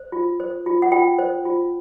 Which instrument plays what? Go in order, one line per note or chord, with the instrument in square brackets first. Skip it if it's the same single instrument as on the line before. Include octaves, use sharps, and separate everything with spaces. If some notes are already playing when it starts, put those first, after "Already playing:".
Already playing: [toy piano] C5
F4
C5
F4
F#5
F4 G5
C5
F4